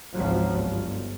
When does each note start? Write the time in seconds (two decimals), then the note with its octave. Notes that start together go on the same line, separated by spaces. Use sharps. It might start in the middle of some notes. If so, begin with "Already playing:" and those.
0.14 G#1 C#2 F3 F#3
0.52 G1